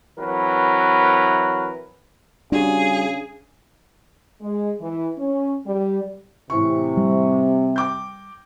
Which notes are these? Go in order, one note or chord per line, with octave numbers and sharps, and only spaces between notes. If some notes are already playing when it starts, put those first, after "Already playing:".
E3 F#3 C4 A#4 B4
C#3 G3 D4 F#4 G#4
G#3
E3
C#4
G3
A2 C3 E3 C#6
G3
G5 D6 G6